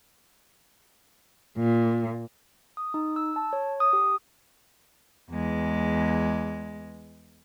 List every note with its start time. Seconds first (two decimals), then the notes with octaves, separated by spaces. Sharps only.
1.57 A#2
2.77 D#6
2.94 D#4
3.16 E6
3.36 A5
3.53 C#5
3.80 D#6
3.93 G4
5.30 E2 G#3